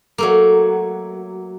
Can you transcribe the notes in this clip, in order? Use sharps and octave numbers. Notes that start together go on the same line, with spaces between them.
F#3 A3 A#3